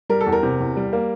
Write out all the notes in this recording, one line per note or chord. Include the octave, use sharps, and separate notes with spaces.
G3 A#4
A4
E2
A#4
C3
E2
G3
A#3